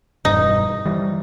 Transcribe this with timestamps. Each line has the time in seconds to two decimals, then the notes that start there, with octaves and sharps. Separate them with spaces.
0.25 E1 G2 D#4
0.86 E3 G3